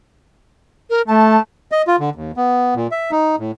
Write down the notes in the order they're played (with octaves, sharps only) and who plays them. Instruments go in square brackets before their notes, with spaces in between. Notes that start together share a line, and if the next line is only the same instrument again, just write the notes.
[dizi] A#4
[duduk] A3 [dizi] A5
[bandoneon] D#5
F4
D3
D#2
B3
A#2
E5
D#4
A2